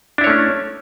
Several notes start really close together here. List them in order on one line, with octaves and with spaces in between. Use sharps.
D4 E4 C#5 A3 C#4